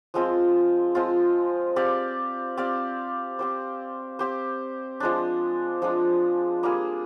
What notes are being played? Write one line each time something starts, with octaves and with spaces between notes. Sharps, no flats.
F3 G#3 C4 F4
F3 G#3 C4 F4
C4 G4 D5 F5
C4 G4 D5 F5
C4 G4 C5
C4 G4 C5
F3 G#3 D4
F3 G#3 D4
G3 A#3 F4 G#4